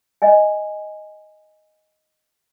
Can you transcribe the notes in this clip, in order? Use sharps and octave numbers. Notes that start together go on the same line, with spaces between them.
D#5 E5 G#5